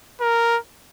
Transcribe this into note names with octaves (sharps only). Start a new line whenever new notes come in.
A#4